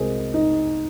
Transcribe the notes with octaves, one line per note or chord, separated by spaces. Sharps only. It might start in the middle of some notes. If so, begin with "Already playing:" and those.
Already playing: C2 C3 G#3 G#4 A#4 C5 D#5
D#4